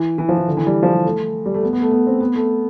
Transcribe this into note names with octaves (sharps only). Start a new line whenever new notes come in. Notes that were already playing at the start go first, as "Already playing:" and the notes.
Already playing: E3
E3
F3
E3
D3
E3
G3
F3
G3
A3
G3
A3
B3
B3
A3
B3
C4
B3
A3